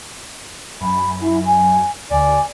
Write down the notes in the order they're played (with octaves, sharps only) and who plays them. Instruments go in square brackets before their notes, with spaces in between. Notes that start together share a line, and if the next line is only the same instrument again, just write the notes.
[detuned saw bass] F#2 [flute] B5
[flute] E4
G#5
[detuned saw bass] D2 [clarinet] D5 [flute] G#5